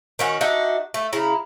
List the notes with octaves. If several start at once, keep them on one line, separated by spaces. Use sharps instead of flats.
D#3 C#4 F#4
D4 D#4 F#4 E5
A3
C#3 E4 A#5